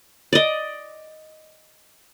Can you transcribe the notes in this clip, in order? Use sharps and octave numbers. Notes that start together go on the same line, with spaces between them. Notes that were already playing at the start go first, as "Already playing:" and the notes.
D5 D#5